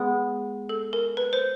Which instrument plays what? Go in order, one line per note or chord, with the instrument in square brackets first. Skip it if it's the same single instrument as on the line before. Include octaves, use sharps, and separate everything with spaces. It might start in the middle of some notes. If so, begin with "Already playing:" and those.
Already playing: [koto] G#3 B3
[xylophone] A4
A#4
B4
C5